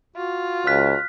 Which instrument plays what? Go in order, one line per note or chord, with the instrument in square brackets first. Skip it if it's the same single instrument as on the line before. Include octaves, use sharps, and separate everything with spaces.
[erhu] F4 [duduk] F#4
[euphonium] C#2 [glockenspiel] F6 F#6 B6